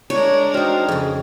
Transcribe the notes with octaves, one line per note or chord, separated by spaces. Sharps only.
G#3 D4 A#4 C#5
C4 D#4 F#4 C5 F6
F2 C#3 G#4